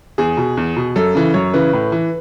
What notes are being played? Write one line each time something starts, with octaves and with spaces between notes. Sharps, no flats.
E2 G#4
B2
E2
B2
F#2 A4
C#3 E3
F#2 C#5
C#3 E3 B4
A2
E3